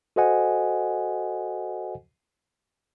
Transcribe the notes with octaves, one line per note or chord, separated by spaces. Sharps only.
F#4 A4 C5 D#5 F#5 G#5